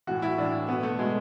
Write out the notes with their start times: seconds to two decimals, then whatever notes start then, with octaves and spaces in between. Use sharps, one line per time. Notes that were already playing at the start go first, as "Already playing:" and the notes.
0.07 A2 E3 F#4
0.22 E4
0.38 A2 E3 D4
0.68 B2 B3
0.83 A3
0.99 B2 G#3